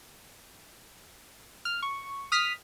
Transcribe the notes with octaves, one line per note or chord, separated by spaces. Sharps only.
F6
C#6
D#6 F6 B6